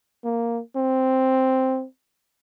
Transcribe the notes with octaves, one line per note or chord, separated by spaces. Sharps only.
A#3
C4